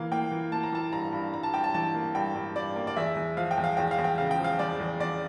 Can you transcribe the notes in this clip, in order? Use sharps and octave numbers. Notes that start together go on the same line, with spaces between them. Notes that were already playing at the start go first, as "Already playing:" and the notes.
Already playing: E3 A#3 F5
A#3 G5
E3
A#3 A5
A#5
E3 A5
G2 A#5
G2
G2 A#5
A5
G2 G5
A5
E3 A5
A#3
G2 G5
G2
G2 D5
A#3
D5
E2 E5
E2
F3 F5
G5
E2
F5
E2 G5
F5
E2
G5
C#3 F5
G5
F3
F5
E2 D5
E2
E2 D5